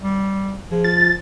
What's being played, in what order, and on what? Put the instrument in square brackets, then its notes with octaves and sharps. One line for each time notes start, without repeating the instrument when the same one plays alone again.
[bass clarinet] G3
[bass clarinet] F3 [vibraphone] G#4
[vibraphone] F4 [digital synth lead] A6